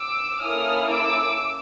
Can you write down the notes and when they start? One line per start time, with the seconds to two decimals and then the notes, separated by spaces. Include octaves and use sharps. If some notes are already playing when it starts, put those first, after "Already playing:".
Already playing: D6 E6
0.40 A#3 C#4 E4 A4 D#6 F6
0.90 D6 E6